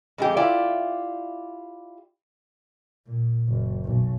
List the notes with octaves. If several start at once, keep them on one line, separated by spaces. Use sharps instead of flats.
F2 G#3 G4
E4 F4 G4 D5
A#2
F#1
B1